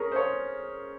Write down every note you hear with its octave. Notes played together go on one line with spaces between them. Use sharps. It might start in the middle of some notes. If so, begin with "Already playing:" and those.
Already playing: C#4 G#4 A#4
C5
C#5